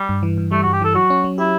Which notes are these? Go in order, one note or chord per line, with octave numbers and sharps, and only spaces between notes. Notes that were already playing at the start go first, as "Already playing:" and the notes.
Already playing: G3
G2
E3
G2
G3 A3
F#4
G2
G4
E3 A4
F#3 F#4
C#4
F#3
E4 G4